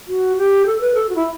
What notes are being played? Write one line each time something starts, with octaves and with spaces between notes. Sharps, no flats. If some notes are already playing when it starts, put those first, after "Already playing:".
F#4
G4
A4
B4
A4
F#4
E4